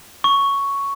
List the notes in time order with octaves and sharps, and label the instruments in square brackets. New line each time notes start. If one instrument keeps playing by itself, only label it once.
[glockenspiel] C#6